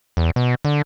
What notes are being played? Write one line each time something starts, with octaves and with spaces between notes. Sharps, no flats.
E2
B2
D3